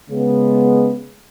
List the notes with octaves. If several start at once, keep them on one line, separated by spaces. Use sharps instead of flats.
C#3 G#3 B3